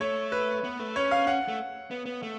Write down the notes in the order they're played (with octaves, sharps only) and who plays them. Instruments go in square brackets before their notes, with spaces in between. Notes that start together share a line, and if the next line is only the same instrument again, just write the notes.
[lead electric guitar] A3 [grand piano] C#5
[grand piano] B4
[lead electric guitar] B3
A3
[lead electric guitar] C#4 [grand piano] C#5
[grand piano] F5
[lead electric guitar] C#4 [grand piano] F#5
[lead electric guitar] A3
B3
B3
A3